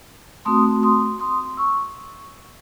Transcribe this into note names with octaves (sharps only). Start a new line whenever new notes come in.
A3 C4 F#4 C6 D#6
C6 D#6
C6 D#6
C#6 E6